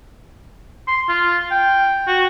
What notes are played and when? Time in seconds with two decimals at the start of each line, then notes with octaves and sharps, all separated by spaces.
0.88 C6
1.09 F4
1.51 G5
2.08 F#4